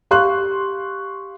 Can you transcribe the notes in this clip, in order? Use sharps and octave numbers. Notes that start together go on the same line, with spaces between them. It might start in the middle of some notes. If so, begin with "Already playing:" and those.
G4 F5 C6 C#6 F#6